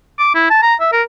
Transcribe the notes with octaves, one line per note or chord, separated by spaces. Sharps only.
D6
E4
A5
A#5
E5
A#4